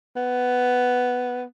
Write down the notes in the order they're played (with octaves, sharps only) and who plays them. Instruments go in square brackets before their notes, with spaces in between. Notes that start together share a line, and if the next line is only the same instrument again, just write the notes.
[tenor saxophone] B3